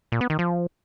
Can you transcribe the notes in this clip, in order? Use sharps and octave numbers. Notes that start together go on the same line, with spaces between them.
A#2
B3
D#3
F3